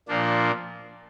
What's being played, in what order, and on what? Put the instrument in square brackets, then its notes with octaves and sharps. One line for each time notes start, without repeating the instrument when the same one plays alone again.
[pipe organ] A#2 F3 A#3 D4